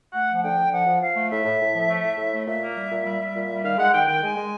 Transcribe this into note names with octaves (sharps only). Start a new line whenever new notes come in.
A3 F#5
F3
F#5
D3 G5
D3
F3 F#5
F3
F3 F5
A3
A2 E5
A2
A2
F3
A3
A2
A2
A3
A#2 E5
A#3
G3
A#2
G3
G3
A#2
G3
D#3 F5
G#3 F#5
D#3 G5
D#3 G5
G#3 G#5
G#3